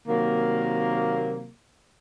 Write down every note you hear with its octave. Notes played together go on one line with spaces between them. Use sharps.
C3 D#3 F#3 A#3